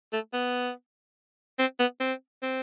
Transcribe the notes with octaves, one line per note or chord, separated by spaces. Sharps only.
A3
B3
C4
B3
C4
C4